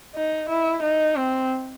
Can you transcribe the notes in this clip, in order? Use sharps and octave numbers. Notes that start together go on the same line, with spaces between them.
D#4
E4
D#4
C4